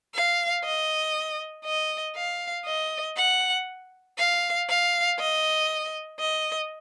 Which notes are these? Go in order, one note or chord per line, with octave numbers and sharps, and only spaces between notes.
F5
D#5
D#5
F5
D#5
F#5
F5
F5
D#5
D#5